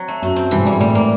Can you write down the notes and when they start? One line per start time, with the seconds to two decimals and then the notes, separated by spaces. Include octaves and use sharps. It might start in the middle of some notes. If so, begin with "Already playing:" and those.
Already playing: F#3 C4
0.08 A3
0.22 F#2 A3
0.36 C4
0.51 G2 E3
0.58 G#2
0.65 G2 G3
0.80 A2 G3
0.95 A#3